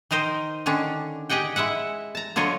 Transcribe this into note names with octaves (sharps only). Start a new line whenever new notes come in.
D#3 D#4 A#4 C5 D#5
D3 D#3 C#4 D4
G4 G#4 D#5 F#5 G5
G#3 E4 E5 F#5
A5 A#5
D3 F#3 F4 C#5 D#5